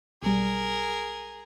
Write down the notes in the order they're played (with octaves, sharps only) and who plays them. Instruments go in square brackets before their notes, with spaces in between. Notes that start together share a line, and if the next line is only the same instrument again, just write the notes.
[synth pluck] B1 G3 [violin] G#4 A#4